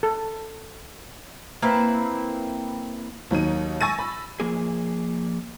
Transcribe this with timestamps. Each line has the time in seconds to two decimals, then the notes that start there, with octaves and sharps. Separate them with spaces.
0.03 A4
1.62 A#3 C4 E4 B4
3.31 D#2 F#3 D#4 D#7
3.81 G#5 C#6 E6 A6 A#6 D#7
3.99 B5
4.40 F3 A#3 G#4